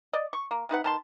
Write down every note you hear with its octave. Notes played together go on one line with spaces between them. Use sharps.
D5 D#5
C#6
A#3
C3 D#4 B4 F#5
D#3 A5 C6